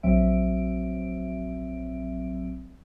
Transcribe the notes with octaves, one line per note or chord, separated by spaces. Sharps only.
A#1 F#3 C4 E5 D7